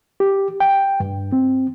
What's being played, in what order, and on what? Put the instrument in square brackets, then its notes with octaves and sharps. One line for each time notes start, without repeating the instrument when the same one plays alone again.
[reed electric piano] G4
G5
G2
C4